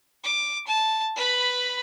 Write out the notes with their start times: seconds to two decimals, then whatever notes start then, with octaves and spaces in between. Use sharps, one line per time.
0.24 D6
0.67 A5
1.16 B4 B5